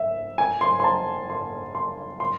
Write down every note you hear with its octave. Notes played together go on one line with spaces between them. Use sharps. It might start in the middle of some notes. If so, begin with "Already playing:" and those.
Already playing: E5
G#5
C6
C6
A5
C6
C6
C6